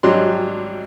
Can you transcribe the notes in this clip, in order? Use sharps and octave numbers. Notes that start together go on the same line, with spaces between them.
G#1 F#3 G3 D4 C6